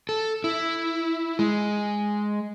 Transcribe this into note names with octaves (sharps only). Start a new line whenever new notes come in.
A4
E4
G#3